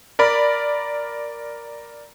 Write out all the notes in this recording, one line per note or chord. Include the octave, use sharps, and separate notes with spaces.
A#4 D5 B5